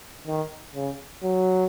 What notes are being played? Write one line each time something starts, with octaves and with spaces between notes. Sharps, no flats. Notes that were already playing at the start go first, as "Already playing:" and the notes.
D#3
C#3
F#3